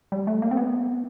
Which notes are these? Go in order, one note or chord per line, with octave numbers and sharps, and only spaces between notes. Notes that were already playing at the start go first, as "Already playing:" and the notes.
G3
A3
A#3
C4
B3